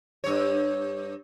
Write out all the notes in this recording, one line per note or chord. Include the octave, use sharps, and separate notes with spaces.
G2 C#5